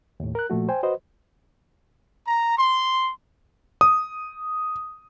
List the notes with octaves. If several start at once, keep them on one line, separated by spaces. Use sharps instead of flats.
D#2 A2
A#4 F#6
A#2 F3 A3 F#4
C5 G5 G#5
F#4 B4 C5 D#5
A#5
C6
D#6